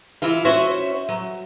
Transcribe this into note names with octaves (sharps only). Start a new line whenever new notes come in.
E3 E4 F4 F5
C#4 F#4 C5 E5 F#5
F#3